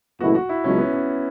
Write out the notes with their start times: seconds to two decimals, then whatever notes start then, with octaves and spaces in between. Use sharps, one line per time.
0.20 F#1 E2 B2 A3 E4 F#4
0.35 F#4
0.49 E4
0.64 C#2 B2 F#3 C#4
0.78 B3
0.93 C#4